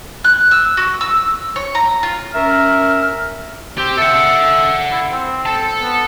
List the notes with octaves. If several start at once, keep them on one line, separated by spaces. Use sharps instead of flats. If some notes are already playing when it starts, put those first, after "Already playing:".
F#6
E6
F#4
E6
C#5
A#5
F4
C#4 A#4 E5 A#5 F6
C4 G4
A4 E5 F#5
E4
C4
A4 A5
B3